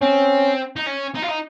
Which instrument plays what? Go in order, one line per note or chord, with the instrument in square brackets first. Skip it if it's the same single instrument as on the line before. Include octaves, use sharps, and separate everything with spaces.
[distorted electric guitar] C4 [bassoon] C#4
[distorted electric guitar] D#4
C#4
D#4
F4
D#4